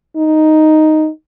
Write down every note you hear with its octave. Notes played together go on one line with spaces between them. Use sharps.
D#4